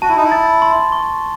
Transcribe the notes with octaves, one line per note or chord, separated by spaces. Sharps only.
F#4 A5
E4
D#4
E4
A6
C6
C#6